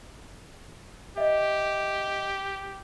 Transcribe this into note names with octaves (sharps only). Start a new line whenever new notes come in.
G4 D#5 E5